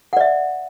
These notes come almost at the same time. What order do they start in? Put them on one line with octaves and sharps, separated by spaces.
F#5 D5 E5